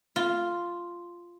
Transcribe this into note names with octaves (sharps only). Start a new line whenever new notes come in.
F4